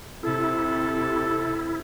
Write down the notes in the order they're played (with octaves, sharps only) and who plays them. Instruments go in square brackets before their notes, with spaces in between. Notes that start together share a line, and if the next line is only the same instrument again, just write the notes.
[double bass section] C3 [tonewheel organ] E4 [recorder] A4